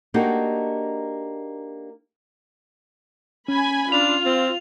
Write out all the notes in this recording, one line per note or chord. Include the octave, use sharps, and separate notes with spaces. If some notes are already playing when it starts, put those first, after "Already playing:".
A#3 D4 D#4 F#4 G4 A4
C#4 G#5 B5
D4 F4 F7
C4